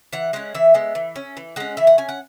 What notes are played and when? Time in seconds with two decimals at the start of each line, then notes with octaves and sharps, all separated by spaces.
0.13 E3 F#5
0.33 G#3 C#4 F#5
0.54 E3 E5
0.74 G#3 B3
0.95 E3
1.16 C#4
1.37 E3
1.56 G#3 C#4 F#5
1.77 E3 E5
1.87 F#5
1.98 C#4 G#5
2.09 F#5